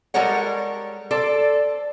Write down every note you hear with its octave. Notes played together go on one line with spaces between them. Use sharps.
G3 G#3 A4 A#4 C#5 F#5
A4 C5 D5